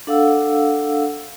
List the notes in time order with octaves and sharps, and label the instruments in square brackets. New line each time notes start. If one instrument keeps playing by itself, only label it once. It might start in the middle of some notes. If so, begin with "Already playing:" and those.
[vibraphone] D4 A4 F5 F#5 E6